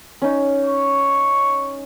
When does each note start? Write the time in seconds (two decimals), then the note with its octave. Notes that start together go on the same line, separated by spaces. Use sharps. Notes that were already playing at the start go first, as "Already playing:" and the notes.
0.22 C#4 D#4
0.65 C#6